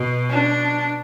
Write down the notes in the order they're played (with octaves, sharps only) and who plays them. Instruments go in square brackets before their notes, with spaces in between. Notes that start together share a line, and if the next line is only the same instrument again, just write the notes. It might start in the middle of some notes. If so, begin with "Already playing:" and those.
Already playing: [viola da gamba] B2
[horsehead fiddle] D4